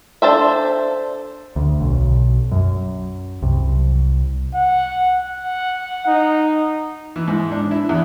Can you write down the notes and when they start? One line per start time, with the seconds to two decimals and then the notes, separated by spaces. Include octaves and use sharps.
0.22 D4 A4 C5 E5
1.56 D2
1.81 B1
2.52 F#2
3.42 C2
4.55 F#5
5.22 F#5
6.07 D#4
7.16 E3
7.28 G#2
7.51 D4
7.71 E4
7.89 E2